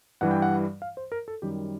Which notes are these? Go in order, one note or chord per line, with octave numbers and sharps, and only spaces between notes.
G2 E3 G3 F#5
G5
F#5
F5
C5
A#4
A4
F#2 D#3 G3 G4